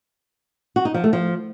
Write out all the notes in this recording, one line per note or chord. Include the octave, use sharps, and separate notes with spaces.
F#4
D#4
F3
A3
F3